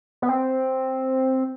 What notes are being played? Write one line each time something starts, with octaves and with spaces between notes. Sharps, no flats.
B3
C4